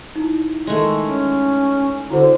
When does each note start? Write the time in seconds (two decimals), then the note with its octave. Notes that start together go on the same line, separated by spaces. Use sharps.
0.16 D#4 E4
0.67 D#3 G#3 A3
1.03 C#4
2.10 D3 E4 F#4 C5